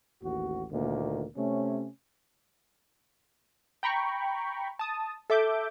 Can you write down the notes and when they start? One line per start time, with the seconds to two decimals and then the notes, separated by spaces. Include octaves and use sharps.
0.22 A1 D#2 F#4
0.71 D2 A#2 D#3 A#3
1.36 C3 A3 C#4
3.83 G5 A#5 B5 C#6
4.79 A5 D#6
5.30 A4 E5 D6 G6